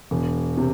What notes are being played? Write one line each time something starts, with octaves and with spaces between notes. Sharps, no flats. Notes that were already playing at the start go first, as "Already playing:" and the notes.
E1
C3